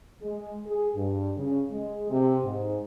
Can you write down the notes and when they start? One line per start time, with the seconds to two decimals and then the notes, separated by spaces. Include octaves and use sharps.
0.22 G#3
0.66 G#4
0.95 G2
1.37 C#3
1.71 G#3
2.10 C3
2.43 G#2